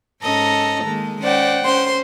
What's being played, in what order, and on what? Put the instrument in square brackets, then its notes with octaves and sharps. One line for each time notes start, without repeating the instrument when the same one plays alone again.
[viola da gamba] G#2 C#4 D#5 [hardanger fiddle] A4 A#5
[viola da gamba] D#3 G#3 A#3
[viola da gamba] C#4 [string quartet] C5 D5 [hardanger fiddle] F#5 G5
[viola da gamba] C#4 [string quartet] C5 C6